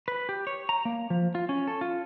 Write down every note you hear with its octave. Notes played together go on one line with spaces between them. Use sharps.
B4
G4
C#5
A#5
A#3
F3
F4
C#4
A4
F4